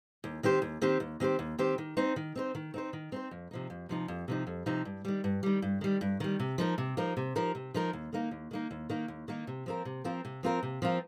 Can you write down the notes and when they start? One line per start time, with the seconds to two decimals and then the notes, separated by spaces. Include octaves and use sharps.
0.24 D#2
0.43 D#3 C4 G4 C5
0.62 D#2
0.82 D#3 C4 G4 C5
1.00 D#2
1.20 D#3 C4 G4 C5
1.39 D#2
1.58 D#3 C4 G4 C5
1.78 D#3
1.97 C4 D#4 C5
2.16 D#3
2.35 C4 D#4 C5
2.55 D#3
2.74 C4 D#4 C5
2.93 D#3
3.12 C4 D#4 C5
3.31 F2
3.51 C3 F3 D#4
3.70 F2
3.89 C3 F3 D#4
4.08 F2
4.28 C3 F3 D#4
4.47 F2
4.66 C3 F3 D#4
4.85 G2
5.05 D#3 G3
5.24 G2
5.43 D#3 G3
5.62 G2
5.81 D#3 G3
6.01 G2
6.20 D#3 G3
6.39 C3
6.58 F3 D#4 A#4
6.78 C3
6.97 F3 D#4 A#4
7.17 C3
7.36 F3 D#4 A#4
7.55 C3
7.74 F3 D#4 A#4
7.93 D#2
8.13 D#3 A#3 D#4
8.31 D#2
8.51 D#3 A#3 D#4
8.71 D#2
8.89 D#3 A#3 D#4
9.08 D#2
9.28 D#3 A#3 D#4
9.47 C3
9.66 F3 C4 F4 A#4
9.85 C3
10.04 F3 C4 F4 A#4
10.25 C3
10.43 F3 C4 F4 A#4
10.63 C3
10.82 F3 C4 F4 A#4